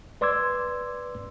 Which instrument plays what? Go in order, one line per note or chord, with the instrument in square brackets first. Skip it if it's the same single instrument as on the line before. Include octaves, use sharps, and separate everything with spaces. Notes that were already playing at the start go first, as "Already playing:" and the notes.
[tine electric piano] B4 D5 C6 D6 E6 G#6